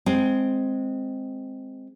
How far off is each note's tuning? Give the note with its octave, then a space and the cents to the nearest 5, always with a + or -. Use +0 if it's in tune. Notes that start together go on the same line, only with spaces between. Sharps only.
G#3 +0 C4 +0